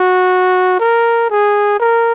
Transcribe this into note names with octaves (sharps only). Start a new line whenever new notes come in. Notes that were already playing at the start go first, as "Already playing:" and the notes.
Already playing: F#4
A#4
G#4
A#4